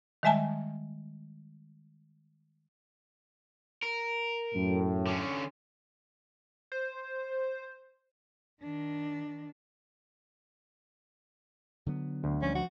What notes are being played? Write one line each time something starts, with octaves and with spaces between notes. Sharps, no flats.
D#3 G3 G#3 E5 G#5 A5
A#4
F#2 A2
D3 C#4
C5
D#3 D4
D3 F#3 B3
D2
F3 G3 C#4
F3 F#4